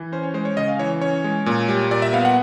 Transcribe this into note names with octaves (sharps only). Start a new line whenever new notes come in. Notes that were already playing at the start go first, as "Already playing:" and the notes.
Already playing: E3
C#4 C5
C#5
G#3 C5
C#5
C#3 D#5
F5
E3 C#5
C#4 C#5
G#3
A#2
G3
A#2 D5
E5
B3 F5
F#5